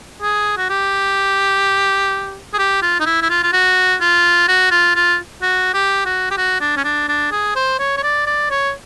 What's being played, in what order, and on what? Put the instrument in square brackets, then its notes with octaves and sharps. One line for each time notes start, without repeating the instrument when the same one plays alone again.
[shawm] G#4
F#4
G4
G#4
G4
F4
D#4
E4
E4
F4
F4
F#4
F4
F#4
F4
F4
F#4
G4
F#4
G4
F#4
D4
C#4
D4
D4
G#4
C5
C#5
C#5
D5
D5
C#5